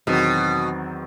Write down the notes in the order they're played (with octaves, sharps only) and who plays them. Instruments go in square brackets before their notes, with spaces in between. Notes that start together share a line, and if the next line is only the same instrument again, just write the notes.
[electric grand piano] E2 D#3 F#3 C4 [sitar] B2